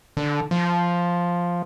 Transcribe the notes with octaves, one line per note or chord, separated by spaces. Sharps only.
D3
F3